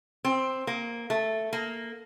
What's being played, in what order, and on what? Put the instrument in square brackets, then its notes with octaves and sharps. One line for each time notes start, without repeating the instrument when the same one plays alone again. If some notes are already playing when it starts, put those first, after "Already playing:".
[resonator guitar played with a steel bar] C4
A#3
A3
A#3